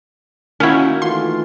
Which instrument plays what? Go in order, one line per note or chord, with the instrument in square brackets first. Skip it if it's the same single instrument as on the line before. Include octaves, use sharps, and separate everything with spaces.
[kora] D#3 A#3 F#4 [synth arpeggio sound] C#4 E4
[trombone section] E3 A3 F4 [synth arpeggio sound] C6